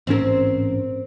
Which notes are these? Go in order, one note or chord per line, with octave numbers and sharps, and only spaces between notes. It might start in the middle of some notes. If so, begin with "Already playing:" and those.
A1 G#2 C4 C#4 A#4